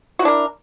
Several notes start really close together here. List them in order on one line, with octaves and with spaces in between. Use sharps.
F#4 E4 D4 A#4